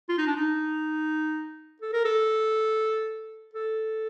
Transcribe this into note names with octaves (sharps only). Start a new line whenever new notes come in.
F4
D#4
D4
D#4
A4
A#4
A4
A4